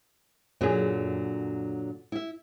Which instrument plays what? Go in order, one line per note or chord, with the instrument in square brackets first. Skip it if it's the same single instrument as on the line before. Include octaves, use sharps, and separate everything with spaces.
[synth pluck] F#2 G#4 [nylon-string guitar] A#2 D3 F#3
[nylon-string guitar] E4 E5